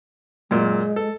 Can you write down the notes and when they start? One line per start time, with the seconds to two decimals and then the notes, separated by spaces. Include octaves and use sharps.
0.51 F#2 A#2 G#3
0.96 A4